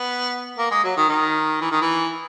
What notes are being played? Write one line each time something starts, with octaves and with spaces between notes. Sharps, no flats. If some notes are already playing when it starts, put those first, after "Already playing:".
Already playing: B3
A#3
G#3
F#3
D#3
D#3
E3
D#3
E3